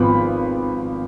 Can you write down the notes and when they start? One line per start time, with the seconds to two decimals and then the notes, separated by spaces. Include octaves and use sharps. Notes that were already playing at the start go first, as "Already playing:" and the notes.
Already playing: G#1 F3 B3 B5